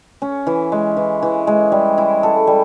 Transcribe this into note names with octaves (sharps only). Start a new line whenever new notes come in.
C#4
E3
G#3
E3
E3
G#3
G3
E4
A4
G3